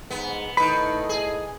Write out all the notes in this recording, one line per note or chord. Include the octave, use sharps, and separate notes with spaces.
G#2 B3
A2 D#3 A4 B4 D#5 B5
G#4